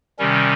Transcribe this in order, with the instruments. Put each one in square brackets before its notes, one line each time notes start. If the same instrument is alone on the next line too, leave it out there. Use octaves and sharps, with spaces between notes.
[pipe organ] C3 D#3 G3 C#4